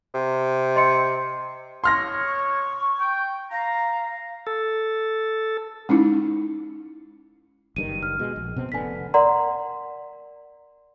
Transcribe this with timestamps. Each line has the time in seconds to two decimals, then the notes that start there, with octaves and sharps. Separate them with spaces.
0.14 C3
0.76 D#5 C6 C#7
1.84 B2 C#5 C6 F6 A#6
2.27 C#6
3.00 G5
3.51 F5 A#5
4.47 A4
5.89 G#3 C#4 D#4 E4
7.76 F#1 G2 D#3 D#7
8.03 F6
8.19 B2 G#3
8.36 A#1
8.56 B2 B3 C4
8.72 F1 D3 B3 G#5 B6
9.14 A#4 D5 F#5 A#5 C6